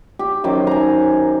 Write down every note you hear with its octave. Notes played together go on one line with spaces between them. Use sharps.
G4
F#2 D#3 C5 D6
G#5 A#5